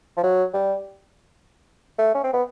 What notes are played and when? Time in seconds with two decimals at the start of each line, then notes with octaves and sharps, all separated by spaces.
0.17 F3
0.23 F#3
0.53 G3
1.99 A3
2.14 C#4
2.23 C4
2.33 B3